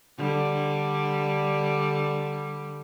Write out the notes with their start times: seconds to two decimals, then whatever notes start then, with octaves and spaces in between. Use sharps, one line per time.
0.18 D3 G3